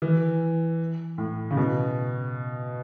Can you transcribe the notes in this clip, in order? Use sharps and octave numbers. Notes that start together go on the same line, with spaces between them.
E3
A2
C#3
B2